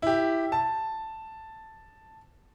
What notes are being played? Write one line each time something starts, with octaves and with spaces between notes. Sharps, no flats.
E4 G4
A5